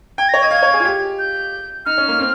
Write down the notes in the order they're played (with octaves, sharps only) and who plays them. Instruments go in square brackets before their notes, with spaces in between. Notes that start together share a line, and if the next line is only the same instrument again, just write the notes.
[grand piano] G5 [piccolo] G#6
[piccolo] A#6
[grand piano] C#5
[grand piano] D#5 [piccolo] G#6
[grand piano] F5 [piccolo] G#6
[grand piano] C#5
G#4
F4
G4
[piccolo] G6
[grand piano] D#4 [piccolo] F6
[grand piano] C#4
A#3
C4